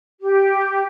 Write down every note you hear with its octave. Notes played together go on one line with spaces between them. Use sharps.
G4